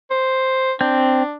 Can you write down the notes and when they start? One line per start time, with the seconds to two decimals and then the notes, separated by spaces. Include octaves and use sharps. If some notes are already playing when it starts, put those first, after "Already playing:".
0.11 C5
0.81 C4 D4 G6